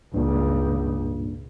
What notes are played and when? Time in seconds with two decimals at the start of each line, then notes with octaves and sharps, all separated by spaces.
0.14 C#2 G2 A#2